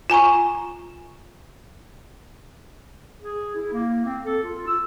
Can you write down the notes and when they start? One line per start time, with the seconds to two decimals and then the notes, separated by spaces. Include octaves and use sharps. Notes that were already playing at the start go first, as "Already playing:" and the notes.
0.10 F4 G#5 A#5 C#6
3.20 G#4
3.55 E4
3.73 A#3
4.05 C4
4.25 A4
4.44 F4
4.67 E6